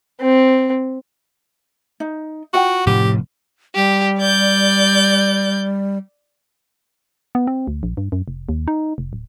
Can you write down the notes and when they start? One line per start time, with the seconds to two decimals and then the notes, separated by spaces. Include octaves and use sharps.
0.21 C4
2.00 D#4
2.54 F4 F#4 F#5 G5
2.87 F1 A2 G4
3.76 G3 G4
4.19 D5 G6
7.35 B3
7.47 C4
7.67 D2
7.83 A#1
7.97 G2
8.12 F#2
8.28 F1
8.49 D#2
8.68 D#4
8.98 F1
9.13 D1